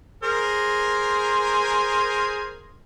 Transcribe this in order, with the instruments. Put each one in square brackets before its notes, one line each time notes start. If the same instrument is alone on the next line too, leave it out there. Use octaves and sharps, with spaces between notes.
[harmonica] G#4 A#4 C5